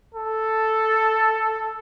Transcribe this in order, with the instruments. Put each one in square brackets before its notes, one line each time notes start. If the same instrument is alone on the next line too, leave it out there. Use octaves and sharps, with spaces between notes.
[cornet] A4